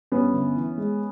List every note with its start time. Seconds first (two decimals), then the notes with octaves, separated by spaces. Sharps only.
0.12 G2 B3 C#4
0.34 G1
0.56 E3
0.78 G#3